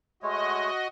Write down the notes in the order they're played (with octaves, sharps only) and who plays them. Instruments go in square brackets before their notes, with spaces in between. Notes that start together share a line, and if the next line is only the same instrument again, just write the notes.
[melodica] G#3 A3 C#5 [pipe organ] F#4 D#5